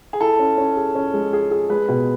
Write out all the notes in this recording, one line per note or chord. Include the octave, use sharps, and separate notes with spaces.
G#4
E4 A4
C#4
C#4
G#4
C#4
G#3
G#4
G#4
G#3 B4
B2